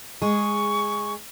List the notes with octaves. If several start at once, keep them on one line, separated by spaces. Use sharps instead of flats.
G#3 G#4 C#6